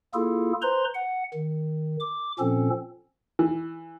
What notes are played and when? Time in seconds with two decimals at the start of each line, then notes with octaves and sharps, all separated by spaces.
0.14 A#3 E4 F4 G#4 A4
0.62 B4 C5 A#5 C6
0.94 F#5
1.33 D#3
2.00 D6
2.39 A#2 F3 C4 C#4 A4
3.39 E3